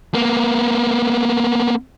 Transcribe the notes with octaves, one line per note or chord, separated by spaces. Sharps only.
A#3 B3